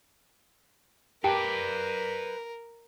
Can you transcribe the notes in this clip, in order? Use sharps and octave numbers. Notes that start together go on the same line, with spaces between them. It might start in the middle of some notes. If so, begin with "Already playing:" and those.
G4 A#4 B4 D5 G5 A5